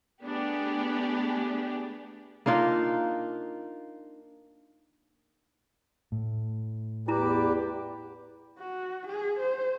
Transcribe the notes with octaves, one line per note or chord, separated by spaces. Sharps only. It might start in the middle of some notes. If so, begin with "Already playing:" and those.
A3 B3 D4 G4 G#4
A#3 D4 D#4 F4
A2
E2 E4 G4 B4 D5 A#5
F#4
G#4
C5